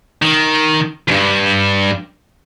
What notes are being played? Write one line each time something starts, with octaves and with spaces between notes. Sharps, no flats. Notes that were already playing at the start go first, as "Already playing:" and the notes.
D#3
E2 G2